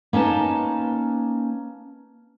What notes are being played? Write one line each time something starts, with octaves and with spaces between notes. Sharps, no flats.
A#3 C#4 D#4 B4 A5